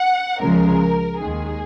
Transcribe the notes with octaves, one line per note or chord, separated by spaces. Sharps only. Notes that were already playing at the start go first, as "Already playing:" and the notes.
Already playing: F#5
C#2 C#3 F3 G#3 A#4
D#2 D#3 G#3 G#4